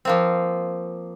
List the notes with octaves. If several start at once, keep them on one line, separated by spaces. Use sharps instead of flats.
F3 A#3 C4